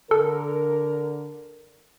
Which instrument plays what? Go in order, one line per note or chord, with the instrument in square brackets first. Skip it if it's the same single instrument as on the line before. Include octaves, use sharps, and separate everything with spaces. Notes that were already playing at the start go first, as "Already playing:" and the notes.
[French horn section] D3 A#4 [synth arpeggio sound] A4